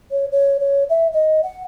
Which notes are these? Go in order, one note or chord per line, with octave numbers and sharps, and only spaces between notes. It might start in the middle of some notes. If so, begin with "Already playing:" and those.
C#5
C#5
C#5
E5
D#5
F#5